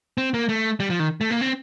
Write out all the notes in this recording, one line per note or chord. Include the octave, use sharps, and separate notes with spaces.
C4
A#3
A3
G3
F3
D#3
A3
A#3
C4